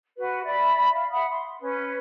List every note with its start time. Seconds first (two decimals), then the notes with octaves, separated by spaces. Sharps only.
0.17 F#4 B4
0.44 D5 E5 B5
0.94 E5 F5
1.11 E5 F#5 B5 D#6
1.30 C6
1.60 C#4 B4